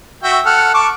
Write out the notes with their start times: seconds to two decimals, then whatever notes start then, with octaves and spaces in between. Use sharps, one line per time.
0.23 F#4 E5 G5
0.46 A4 F#5 F6
0.74 A5 C#6 D6